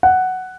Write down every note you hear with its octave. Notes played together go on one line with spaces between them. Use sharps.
F#5